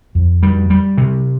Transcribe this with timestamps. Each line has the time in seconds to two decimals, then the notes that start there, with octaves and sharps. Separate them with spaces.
0.15 F2
0.43 G3
0.70 G3
0.98 C3